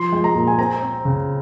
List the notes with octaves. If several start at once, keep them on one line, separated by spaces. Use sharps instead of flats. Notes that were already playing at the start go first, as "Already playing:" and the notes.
Already playing: F3 C6
G#3
A#5
A#2
G#5
C4 A#5
C4
C#3